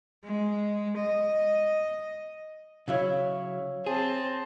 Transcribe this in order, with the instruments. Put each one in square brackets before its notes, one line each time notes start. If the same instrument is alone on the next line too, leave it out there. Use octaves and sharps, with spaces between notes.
[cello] G#3
D#5
[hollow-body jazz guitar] C#3 F#3 E4 [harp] C#5 E5 F5
[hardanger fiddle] C4 A5 [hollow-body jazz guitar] G#4